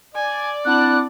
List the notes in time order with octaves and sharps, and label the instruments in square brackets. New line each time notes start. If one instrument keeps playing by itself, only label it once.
[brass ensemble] D5 [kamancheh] G#5
[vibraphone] C4 E4 B5 [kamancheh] D4 F#5 [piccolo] F#6